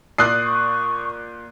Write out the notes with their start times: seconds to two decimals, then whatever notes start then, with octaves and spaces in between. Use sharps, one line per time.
0.18 A#2 D5 D#6 F#6 C7
0.45 C#6